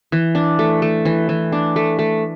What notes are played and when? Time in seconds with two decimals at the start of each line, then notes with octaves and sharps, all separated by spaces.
0.12 E3
0.35 D4
0.59 A3
0.82 A3
1.05 E3
1.29 E3
1.52 D4
1.76 A3
1.99 A3